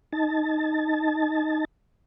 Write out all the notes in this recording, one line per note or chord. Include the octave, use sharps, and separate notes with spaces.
D#4 A5